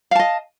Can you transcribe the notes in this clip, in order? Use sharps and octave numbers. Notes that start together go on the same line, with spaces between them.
D#5 F5 A5